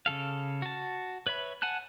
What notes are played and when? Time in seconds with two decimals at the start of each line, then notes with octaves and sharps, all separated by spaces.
0.06 C#3 F3 A4 F5
0.62 F#4 A5
1.27 B4 C#5 E5 B5
1.62 F#5 G#5 A5 F#6